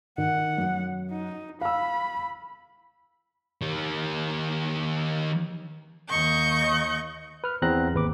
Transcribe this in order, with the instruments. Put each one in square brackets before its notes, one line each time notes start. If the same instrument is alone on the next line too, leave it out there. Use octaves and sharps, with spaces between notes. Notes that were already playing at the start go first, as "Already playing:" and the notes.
[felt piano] D#3 [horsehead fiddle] F#5
[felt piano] F#2
[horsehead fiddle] D#4
[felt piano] F5 E6 [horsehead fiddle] B5
[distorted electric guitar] D#3 G4
[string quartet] D#2 D#5 C#6 G6
[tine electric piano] B4 F6
E2 B3 C4 A#5 F#6 A#6
G#1 D#2 B4 D6